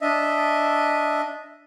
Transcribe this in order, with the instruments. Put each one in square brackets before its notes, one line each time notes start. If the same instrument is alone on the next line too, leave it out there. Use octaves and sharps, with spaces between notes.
[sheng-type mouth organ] D4 D#5 E5